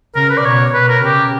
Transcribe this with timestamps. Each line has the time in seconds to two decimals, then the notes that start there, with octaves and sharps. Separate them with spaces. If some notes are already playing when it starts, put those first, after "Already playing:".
0.15 C#3 A#4
0.30 B4
0.37 D5
0.44 B2 C#5
0.74 B2 B4
0.88 A#4
1.03 C#3 G4